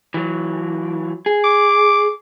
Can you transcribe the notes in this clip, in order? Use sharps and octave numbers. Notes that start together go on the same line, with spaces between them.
E3 F#3
G#4
D6